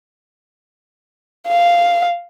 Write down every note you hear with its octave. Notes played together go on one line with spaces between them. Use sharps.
F5